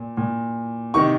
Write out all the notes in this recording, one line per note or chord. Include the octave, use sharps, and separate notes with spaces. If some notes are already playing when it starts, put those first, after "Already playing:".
Already playing: A#2
A#2
C3 D#3 C#6